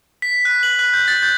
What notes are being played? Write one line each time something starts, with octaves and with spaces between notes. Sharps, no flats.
B6
F#6
F#7
F#6
G6
A6
G6